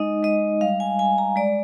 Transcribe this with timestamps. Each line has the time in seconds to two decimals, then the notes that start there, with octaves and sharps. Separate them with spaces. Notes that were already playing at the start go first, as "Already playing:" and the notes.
Already playing: G#3 D#4 D#5
0.23 G#3 D#5
0.61 G3 F5
0.80 G#5
0.99 G3 G#5
1.18 A#5
1.36 G#3 D5